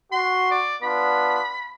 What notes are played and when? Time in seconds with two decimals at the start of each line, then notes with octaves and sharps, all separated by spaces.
0.12 F#4 C6
0.51 D5
0.83 B3 D4 F4 B5